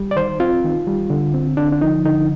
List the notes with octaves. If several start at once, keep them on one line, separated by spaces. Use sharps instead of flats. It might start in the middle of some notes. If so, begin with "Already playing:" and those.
Already playing: G3
D5
D#3 C5
C4 F4
D#3
G3
D3
C4
D3 D4
D4
F3 D#4
D3 D#4